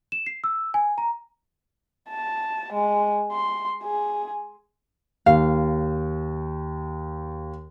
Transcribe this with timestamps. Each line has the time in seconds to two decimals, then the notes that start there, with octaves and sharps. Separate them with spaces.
0.12 E7
0.26 C7
0.44 E6
0.74 G#5
0.98 A#5
2.09 A5
2.73 G#3
3.32 C6
3.83 G#4
5.26 D#2 F5